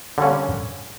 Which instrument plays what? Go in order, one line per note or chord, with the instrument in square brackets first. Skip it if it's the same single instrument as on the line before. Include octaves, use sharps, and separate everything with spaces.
[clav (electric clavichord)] D3 G3 A#3 C#4